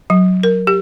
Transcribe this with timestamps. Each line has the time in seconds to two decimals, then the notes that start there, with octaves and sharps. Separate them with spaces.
0.10 F#3
0.43 A#4
0.67 G4